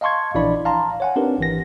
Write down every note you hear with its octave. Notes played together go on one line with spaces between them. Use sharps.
D#5 F5 A5 C6 C#6 G#6
A#1 E3 D4 E4 D5 B5
F5 A5 A#5 C6
C#5 F#5 G#5
C4 D4 D#4 G4 A#4 B4
G#1 E3 A#6